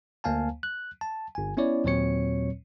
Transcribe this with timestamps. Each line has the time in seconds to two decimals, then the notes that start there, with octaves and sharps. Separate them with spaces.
0.24 D2 A#3 F5 G#5 A5
0.63 F#6
1.01 A5
1.35 G1 G#5
1.57 B3 C#4 E4 C#5 D5
1.84 D#2 A#2 F#3 C4 C#5 C#7